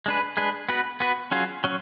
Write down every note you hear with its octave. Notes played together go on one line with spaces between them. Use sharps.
G#3 D4 G#4 B4
G#3 D4 G#4 B4
B3 F#4 B4
B3 F#4 B4
F#3 C#4 F4 G#4
F#3 C#4